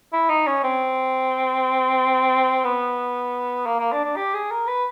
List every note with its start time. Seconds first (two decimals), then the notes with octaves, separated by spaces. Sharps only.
0.13 E4
0.30 D#4
0.47 C#4
0.63 C4
2.65 B3
3.66 A#3
3.79 A#3
3.92 D4
4.04 D4
4.16 G4
4.34 G#4
4.51 A#4
4.67 B4